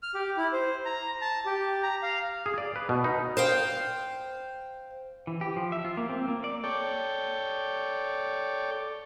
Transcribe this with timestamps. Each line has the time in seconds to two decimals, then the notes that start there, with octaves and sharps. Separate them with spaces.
0.03 F6
0.14 G4
0.37 E4
0.53 C5
0.85 A#5
1.21 A5
1.46 G4
1.83 A#5
2.03 F5
2.46 G#4
2.58 D5
2.76 B4
2.89 B2
3.04 D#4
3.37 C5 F5 G5
5.27 E3
5.41 G4
5.56 F3
5.72 E5
5.85 F4
5.97 A#3
6.09 C4
6.28 A#3
6.44 D5
6.64 A4 C#5 D5 G5